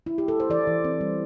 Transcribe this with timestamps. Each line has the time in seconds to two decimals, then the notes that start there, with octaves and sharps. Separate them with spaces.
0.06 E4
0.18 G4
0.28 A4
0.40 C5
0.50 E3 D5
0.67 E3
0.85 C4
1.01 G3